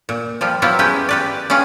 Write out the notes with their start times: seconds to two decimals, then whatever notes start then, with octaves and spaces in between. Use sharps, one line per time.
0.09 A#2
0.41 F3 G3 F4
0.62 F#3 B3 E4 F4 G4
0.79 G#3 C#4 G4 B4 G5
1.09 G4 B4 D5
1.50 G3 C#4 F4 G#4